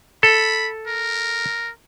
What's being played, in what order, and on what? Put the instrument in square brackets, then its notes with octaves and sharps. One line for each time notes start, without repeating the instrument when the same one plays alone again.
[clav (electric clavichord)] A4 [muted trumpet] B5
[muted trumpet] A#4